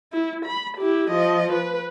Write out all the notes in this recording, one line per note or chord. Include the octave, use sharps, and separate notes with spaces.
E4
B5
E4 G4
F3 D#5
B4